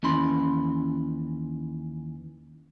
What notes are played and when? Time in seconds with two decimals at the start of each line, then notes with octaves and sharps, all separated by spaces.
0.03 D#2 E3 C#4 B5 C6